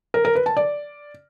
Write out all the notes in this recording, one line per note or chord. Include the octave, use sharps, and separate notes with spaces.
A#4
A#4
B4
A5
D5